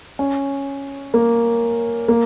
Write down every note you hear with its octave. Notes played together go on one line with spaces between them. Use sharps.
C#4
A#3
A#3